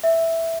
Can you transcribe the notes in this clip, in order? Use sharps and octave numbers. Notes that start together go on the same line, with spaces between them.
E5